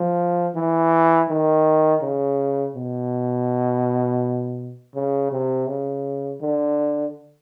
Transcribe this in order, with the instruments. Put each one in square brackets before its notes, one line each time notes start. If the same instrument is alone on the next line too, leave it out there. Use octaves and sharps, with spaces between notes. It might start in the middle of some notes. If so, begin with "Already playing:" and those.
Already playing: [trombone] F3
E3
D#3
C#3
B2
C#3
C3
C#3
D3